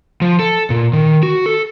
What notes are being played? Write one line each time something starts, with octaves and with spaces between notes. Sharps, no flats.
F3
A4
A#2
D#3
F#4
A4